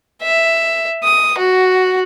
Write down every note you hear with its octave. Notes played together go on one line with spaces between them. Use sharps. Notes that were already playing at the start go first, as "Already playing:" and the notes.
E5
D#6
F#4